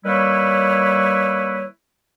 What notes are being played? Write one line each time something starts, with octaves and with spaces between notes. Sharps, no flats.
D#3 G3 A#3 E4 B4 C#5